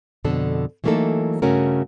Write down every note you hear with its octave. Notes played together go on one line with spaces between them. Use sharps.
F2 B2 D3 D4 A4
E3 F#3 A3 A#3 D#4 A4
G2 C#3 A3 C#4 F#4 A#4